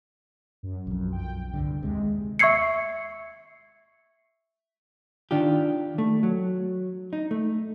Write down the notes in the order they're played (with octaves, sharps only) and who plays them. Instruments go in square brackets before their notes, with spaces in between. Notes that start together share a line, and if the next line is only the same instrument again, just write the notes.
[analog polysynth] F#2
[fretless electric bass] B1 F2
[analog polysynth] G5
[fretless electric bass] C2 G2 D3
[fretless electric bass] D#2 C3 [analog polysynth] G#3
[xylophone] E5 C#6 E6 G#6 C7 C#7
[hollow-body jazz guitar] D#3 D4 F4 G4
A3
F#3
D#4
A3